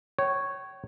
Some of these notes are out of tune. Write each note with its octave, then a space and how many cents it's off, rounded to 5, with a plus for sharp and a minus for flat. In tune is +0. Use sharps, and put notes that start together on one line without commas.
C#5 -5 G5 -40